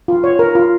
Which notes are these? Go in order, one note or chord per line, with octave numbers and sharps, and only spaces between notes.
F4
C#5
A#4
F4